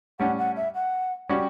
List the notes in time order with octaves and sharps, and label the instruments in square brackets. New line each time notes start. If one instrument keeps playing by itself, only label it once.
[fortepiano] A2 G3 C#4 [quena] F#5
[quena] F#5
E5
F#5
[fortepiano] G3 C#4 F#4 [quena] G5